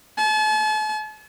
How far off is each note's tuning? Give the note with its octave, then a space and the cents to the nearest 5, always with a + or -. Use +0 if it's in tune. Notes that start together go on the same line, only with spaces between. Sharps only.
A5 -40